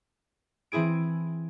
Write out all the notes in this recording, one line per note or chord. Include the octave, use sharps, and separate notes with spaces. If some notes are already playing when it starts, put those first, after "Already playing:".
E3 C4 E4 G#4 D7